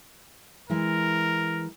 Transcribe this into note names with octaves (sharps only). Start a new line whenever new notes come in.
E3 G#3 E4 A#4